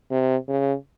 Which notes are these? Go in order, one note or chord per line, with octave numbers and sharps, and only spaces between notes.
C3
C#3